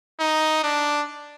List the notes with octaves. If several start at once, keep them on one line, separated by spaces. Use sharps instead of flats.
D#4
D4